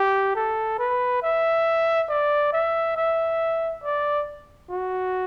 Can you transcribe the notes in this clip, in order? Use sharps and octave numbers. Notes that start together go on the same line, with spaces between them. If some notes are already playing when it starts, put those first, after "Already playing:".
Already playing: G4
A4
B4
E5
D5
E5
E5
D5
F#4